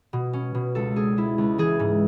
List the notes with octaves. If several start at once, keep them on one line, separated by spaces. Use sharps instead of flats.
B2
C#4
B2
C#2 A4
D4 G#4
G#3 E4
C#2
E3 G#4
G#2